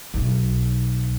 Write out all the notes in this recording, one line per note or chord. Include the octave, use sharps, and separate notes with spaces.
B1